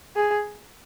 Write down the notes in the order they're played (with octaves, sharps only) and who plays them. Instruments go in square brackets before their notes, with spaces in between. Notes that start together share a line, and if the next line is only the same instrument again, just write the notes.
[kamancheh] G#4